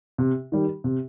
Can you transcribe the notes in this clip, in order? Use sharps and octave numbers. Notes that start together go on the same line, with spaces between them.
C3
D#3 G3
C3